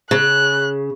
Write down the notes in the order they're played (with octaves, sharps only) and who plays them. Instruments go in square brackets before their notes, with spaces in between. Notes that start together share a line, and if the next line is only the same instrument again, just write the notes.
[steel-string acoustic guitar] C#3 [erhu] F#6